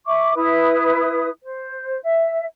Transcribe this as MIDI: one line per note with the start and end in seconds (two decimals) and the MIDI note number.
0.06 0.33 76
0.06 0.33 85
0.06 0.33 86
0.35 1.29 64
0.35 1.29 71
0.35 1.29 87
1.43 1.99 72
2.03 2.45 76